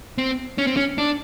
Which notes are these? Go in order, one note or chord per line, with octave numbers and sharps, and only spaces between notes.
C4
C#4
C4
C#4
D4